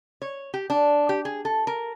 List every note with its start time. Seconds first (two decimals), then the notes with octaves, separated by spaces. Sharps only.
0.22 C#5
0.54 G4
0.70 D4
1.09 G4
1.25 G#4
1.45 A4
1.67 A#4